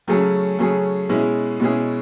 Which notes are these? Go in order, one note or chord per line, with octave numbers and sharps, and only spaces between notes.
C#3 F#3 A3 C#4 G#4
C#3 F#3 A3 C#4 G#4
B2 G#3 C#4 E4 G#4
B2 G#3 C#4 E4 G#4